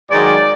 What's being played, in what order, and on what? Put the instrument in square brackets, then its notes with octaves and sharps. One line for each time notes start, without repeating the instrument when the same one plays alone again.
[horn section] G#2 D#3 F#3 D5